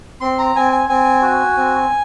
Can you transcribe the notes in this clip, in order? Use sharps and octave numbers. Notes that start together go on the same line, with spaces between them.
C4 C6
A#5
C4 G#5
G#5
C4 G#5
F#4
C4